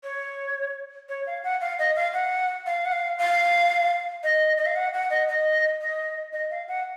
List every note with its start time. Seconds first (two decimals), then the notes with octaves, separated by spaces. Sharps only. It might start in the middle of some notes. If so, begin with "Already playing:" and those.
0.03 C#5
1.09 C#5
1.26 F5
1.44 F#5
1.61 F5
1.79 D#5
1.96 F5
2.13 F#5
2.66 F5
2.85 F#5
2.92 F5
3.19 F5
4.23 D#5
4.57 D#5
4.66 F5
4.76 F#5
4.94 F#5
5.10 D#5
5.28 D#5
5.81 D#5
6.33 D#5
6.51 F5
6.68 F#5